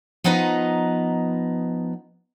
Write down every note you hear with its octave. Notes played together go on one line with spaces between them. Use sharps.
F3 B3 D#4 B4 D#5 A#5